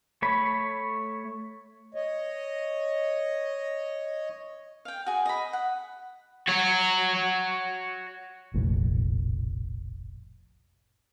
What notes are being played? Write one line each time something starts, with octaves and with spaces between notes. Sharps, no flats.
A3 C#5 B5
C#5 D#5
F5 G5
F#4 G#4
D#5 B5
F#5
F#4 C#5
F1 A#1 A2